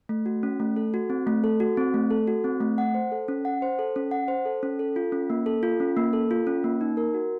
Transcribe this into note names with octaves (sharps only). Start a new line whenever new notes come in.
A3
F#4
C#4
A3
A4
F#4
C4
A3
A4
F#4
C4
A3
A4
F#4
C4
A3
F#5
C5
A4
C#4
F#5
C5
A4
C#4
F#5
C5
A4
C#4
A4
F4
C#4
A#3
A4
F4
C#4
A#3
A4
F4
C#4
A#3
D#4
A#4
F#4